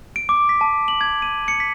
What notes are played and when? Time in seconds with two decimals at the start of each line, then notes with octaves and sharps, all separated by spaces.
0.16 D7
0.29 D6
0.49 B6
0.61 A5
0.88 F#7
1.01 G#6
1.22 D#7
1.48 C#7
1.60 B6